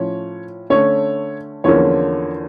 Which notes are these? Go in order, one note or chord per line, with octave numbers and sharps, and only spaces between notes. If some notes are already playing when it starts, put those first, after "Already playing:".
Already playing: A2 F3 C#4 C#5
D3 A3 C#4 C#5
E2 D3 F3 A#3 C#4 C#5